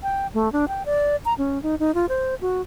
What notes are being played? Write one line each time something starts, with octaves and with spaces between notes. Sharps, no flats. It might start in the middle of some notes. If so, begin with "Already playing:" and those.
G5
A3
D4
G5
D5
A#5
C#4
D#4
D#4
F4
C5
F#4